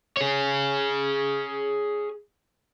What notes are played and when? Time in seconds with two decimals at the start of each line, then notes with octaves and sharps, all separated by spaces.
0.17 G#4 C#5